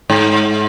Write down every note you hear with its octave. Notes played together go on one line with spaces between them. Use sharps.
G#2